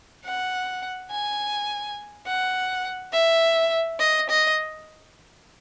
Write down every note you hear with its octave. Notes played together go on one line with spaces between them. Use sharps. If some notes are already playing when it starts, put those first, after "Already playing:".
F#5
G#5
F#5
E5
D#5
D#5